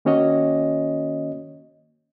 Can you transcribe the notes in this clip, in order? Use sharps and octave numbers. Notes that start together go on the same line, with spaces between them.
D#3 A#3 C#4 F#4 C#5 D#5